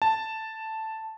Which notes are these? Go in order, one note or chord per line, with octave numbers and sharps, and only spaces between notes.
A5